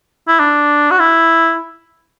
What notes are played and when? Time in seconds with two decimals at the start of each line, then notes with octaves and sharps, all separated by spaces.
0.27 E4
0.39 D4
0.91 F#4
0.99 E4